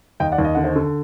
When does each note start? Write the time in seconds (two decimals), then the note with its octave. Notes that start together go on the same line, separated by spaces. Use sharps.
0.20 D#2 D#5 G5
0.32 D5 F#5
0.38 D#2
0.44 D#5
0.55 D3 F#5
0.64 C5 D#5
0.76 D3